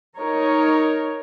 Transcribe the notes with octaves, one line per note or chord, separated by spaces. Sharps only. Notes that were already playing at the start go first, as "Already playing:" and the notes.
D#4 A#4 C#5